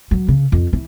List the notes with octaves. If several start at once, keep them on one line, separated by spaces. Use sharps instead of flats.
F#3
C#3
F2
E3